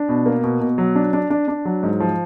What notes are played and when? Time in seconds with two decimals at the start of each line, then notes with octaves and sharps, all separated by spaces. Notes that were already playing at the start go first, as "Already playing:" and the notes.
Already playing: D4
0.09 B2
0.26 A#3
0.44 B2
0.61 B2
0.78 F#3
0.95 D4
1.13 D4
1.30 D4
1.48 D4
1.65 F#3
1.83 G#2
2.00 F3